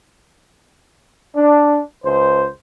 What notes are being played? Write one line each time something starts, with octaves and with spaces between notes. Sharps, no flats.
D4
C#2 C5